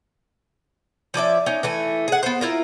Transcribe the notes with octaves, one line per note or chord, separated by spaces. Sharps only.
F3 C#4 D5 E5
C#4 D#4
E3 A3 G#5
G#4 F#5
B3 C5
E4 F4 A#4